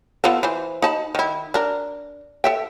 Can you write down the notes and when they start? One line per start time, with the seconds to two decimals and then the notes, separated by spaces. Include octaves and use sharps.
0.24 B3 F4 A4
0.43 E3 C5
0.82 D#4 A5 B5
1.15 D#3 E4
1.54 D4 A#4
2.44 A4 E5 G5